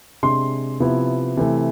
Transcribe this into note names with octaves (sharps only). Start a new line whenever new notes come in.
C3 G#3 D4 C6
C3 F3 B3 E4
C3 E3 A3